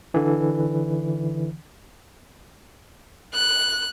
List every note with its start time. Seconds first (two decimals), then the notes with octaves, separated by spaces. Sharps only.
0.14 D3 E3
3.34 F#6